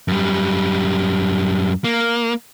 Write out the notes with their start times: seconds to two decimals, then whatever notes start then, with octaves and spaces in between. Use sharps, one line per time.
0.08 F#2 G3
1.84 A#3